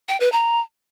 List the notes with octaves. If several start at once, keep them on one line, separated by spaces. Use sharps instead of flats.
G5
B4
A#5